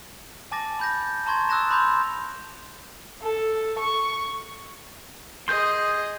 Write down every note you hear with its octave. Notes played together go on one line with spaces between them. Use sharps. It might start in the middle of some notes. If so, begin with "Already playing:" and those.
G#5 A5 D6 A6 A#6
B5 G6 A#6
A5 A#5 C6 C#6 G#6 A6
D#6 E6 F#6 A6 A#6 E7
B5 C6 D6 G6 F7
A4
C#6
G#4 D#5 C6 G6